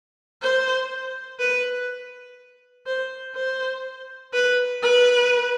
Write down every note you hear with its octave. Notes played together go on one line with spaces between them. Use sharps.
C5
B4
C5
C5
B4
B4